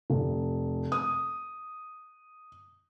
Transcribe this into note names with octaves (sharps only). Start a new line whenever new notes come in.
F1
D#6